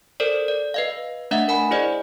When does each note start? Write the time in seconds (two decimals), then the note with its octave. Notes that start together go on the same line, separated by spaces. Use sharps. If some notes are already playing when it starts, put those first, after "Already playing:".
0.20 A4 A#4 C5 D5
0.48 D5
0.74 B4 D#5 F5
1.31 A3 D4 D#5 E5 F#5
1.48 A#4 F#5 G#5 B5
1.71 E4 G#4 C5 D5 D#5